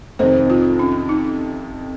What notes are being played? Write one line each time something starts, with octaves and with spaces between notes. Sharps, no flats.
F2 C3 D#3 C5
F4
C#4
D#4